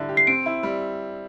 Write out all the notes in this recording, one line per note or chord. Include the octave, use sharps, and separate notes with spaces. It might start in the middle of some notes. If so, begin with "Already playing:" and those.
Already playing: D3 G3 E4
G4
C7
C4 D7
E4
G3